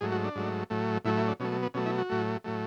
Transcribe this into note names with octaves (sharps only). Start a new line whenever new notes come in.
G#2 F#3 A3 G#4
F#4
D4
G#2 F#3 A3
A2 F#3 A3
A2 F#3 A3 E4
E4
D4
B2 F#3 A3 C#4
A3
B3
B2 F#3 A3 C#4
E4
F#4
A2 F#3 A3
A2 F#3 A3